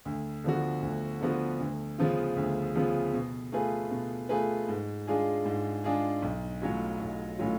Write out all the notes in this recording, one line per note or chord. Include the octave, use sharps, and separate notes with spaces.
D2
D3 F3 B3 F#4
D2
D3 F3 B3 F#4
D2
C#3 F3 B3 F4
D2
C#3 F3 B3 F4
B2
A3 F4 G#4 B4
B2
A3 F4 G#4 B4
G#2
G#3 D4 F4 G#4
G#2
G#3 D4 F4 G#4
B1
A2 F#3 C#4 F4
B1
A2 F#3 C#4 F4